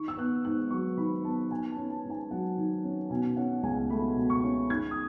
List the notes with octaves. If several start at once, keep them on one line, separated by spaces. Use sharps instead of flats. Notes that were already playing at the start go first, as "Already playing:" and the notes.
Already playing: D#3 C#6
E6
B3 F#6
G#2 F#6
F#3 C#6
D#3 B5
B3 A5
D#3 G#5
A5
C#4
A5
G#2
G#5
F#3 F#5
D#3
C#4
B2 G#5
C#4 F#5
C#2 G#5
A3 B5
B2
C#6
C#4
D#3 G#6
D#6